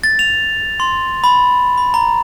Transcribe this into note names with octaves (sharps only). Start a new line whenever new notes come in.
A6
F7
C6
B5
B5
A#5